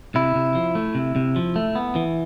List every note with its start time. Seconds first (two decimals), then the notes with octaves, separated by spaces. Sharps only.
0.15 C3 E4
0.35 C3
0.55 F3
0.75 A3
0.95 C3
1.16 C3
1.36 F3
1.56 A3
1.75 B3
1.96 E3